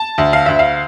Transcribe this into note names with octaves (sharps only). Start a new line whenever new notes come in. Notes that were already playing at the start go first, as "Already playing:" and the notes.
Already playing: A5
D2
F5
D2 E5
F5